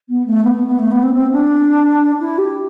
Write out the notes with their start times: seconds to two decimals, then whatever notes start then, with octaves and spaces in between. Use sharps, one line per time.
0.09 B3
0.26 A3
0.44 B3
0.56 B3
0.67 B3
0.79 A3
0.91 B3
1.03 C4
1.14 C4
1.32 D4
2.20 E4
2.38 G4